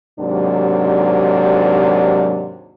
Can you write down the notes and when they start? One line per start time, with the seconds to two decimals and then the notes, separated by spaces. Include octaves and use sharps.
0.20 D#2 G#2 C3 F#3 D4